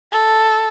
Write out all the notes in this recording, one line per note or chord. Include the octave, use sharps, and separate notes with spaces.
A4